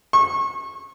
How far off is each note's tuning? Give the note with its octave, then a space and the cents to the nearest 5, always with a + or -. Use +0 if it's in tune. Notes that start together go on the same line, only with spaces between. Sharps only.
C#6 -25